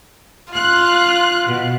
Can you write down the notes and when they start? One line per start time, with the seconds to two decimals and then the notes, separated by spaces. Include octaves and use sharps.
0.54 F4 F#6
1.47 B2